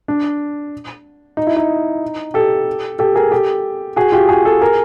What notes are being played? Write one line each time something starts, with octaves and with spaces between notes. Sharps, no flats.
D4
D#4
E4
D#4
G4 A4
G4 A4
G#4 A#4
G4 A4
F#4 G#4
F4 G4
F#4 G#4
G4 A4
G#4 A#4